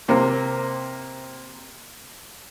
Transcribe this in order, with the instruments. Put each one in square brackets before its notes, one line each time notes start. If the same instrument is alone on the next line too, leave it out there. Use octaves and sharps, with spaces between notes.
[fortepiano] C3 A#3 C4